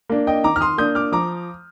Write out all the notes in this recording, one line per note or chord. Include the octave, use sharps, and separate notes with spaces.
A#3 D4
D#5 G5
D#3 A#5 D6
F6
C6 D#6
A#3 D4 D#6 G6
D6 F6
F3 A#5 D6